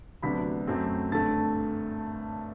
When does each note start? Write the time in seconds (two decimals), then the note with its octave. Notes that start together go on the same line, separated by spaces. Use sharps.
0.22 D2 C3 F#3 B3 D4 B5 B6
0.67 F#2 F#3 A3 C4
1.12 G2 D3 A3 C4 A5 A6